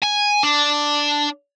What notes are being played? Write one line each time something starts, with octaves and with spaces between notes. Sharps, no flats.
G#5
D4